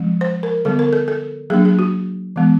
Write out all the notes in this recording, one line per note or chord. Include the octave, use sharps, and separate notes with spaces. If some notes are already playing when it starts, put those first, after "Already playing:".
Already playing: F3 G#3 C4
C5
A#4
D3 G3 B3 A4
A#4
A4
A4
F#3 A#3 D4 G#4
G#4
F#4
E3 G#3 B3